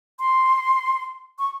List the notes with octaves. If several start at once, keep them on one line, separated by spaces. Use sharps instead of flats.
C6
C#6